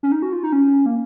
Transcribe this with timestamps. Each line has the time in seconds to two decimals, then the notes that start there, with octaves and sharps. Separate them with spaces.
0.03 C#4
0.12 D#4
0.22 F#4
0.33 F4
0.43 D#4
0.53 C#4
0.86 A#3